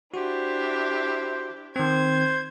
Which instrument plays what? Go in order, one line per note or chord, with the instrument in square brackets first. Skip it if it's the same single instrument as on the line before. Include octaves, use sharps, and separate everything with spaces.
[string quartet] D4 E4 G4 [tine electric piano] F#4 [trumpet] C5
[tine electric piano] D#3 C4 [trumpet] C5 [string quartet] G#6